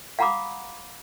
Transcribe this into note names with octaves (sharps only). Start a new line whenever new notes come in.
F5 F#5 A#5 B5 D6 D#6